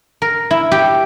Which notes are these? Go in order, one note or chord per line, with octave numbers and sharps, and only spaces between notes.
A#4
E4
G4